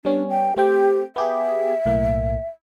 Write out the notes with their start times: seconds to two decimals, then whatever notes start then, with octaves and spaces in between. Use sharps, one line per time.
0.05 G3 B3 C#4 D4
0.29 G5
0.56 A3 C4 G4 G5
1.16 B3 G4 G#4 E5
1.86 B1 A2 A#3